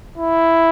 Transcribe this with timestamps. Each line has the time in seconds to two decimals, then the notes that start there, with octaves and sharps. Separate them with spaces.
0.18 E4